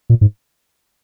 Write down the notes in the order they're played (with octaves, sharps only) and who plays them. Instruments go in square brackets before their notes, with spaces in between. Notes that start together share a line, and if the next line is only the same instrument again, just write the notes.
[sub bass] A#2
G#2